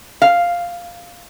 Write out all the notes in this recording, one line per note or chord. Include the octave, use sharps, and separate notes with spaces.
F5